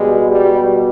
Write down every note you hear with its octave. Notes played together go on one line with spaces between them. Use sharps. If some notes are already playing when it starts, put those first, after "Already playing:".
Already playing: B2 G3 G#3
G3